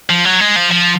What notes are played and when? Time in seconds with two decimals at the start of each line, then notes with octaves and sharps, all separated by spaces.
0.10 F3
0.25 F#3
0.40 G#3
0.56 F3
0.71 F3